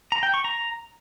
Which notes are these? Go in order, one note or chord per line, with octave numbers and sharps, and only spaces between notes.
A#5
G5
C#6
A#5